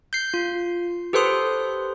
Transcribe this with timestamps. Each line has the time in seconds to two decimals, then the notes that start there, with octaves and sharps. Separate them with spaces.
0.13 G6 C7
0.34 F4
1.13 G4 A4 B4 C5 C6 D#6